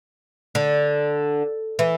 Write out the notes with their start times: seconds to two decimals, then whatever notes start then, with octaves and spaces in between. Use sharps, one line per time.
0.55 D3
1.79 E3